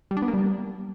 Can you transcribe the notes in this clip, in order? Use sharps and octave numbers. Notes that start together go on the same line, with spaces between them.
G3
D4
B3
A#3
G3